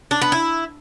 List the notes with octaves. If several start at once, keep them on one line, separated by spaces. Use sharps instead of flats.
D4
B3
E4